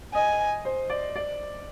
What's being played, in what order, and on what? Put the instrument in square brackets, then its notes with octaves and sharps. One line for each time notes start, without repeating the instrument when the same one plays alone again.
[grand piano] D#5 [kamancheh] G#5
[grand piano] C5
D5
D5